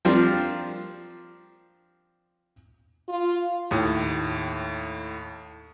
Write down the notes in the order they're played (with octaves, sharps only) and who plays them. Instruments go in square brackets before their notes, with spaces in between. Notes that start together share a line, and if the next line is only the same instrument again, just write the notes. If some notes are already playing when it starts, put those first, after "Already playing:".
[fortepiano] F3 G3 A#3 C4 D4 F4
[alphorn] F4
[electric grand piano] D#2 A2